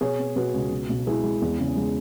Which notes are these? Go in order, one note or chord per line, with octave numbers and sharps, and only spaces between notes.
B2 G#4 C#5
B3
B2 F#4 B4
C#2
B2
B1
G#3 E4 G#4
G#3
E2
C#3
G#3